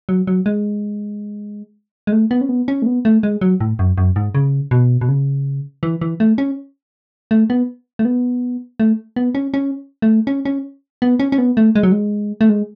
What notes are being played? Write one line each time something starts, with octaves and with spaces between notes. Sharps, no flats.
F#3
F#3
G#3
G#3
A3
B3
C#4
B3
C#4
A3
B3
A3
G#3
F#3
A2
F#2
F#2
G#2
C#3
B2
B2
C#3
E3
E3
A3
C#4
A3
B3
A3
B3
A3
B3
C#4
C#4
A3
C#4
C#4
B3
C#4
C#4
B3
A3
G#3
F#3
G#3
A3
G#3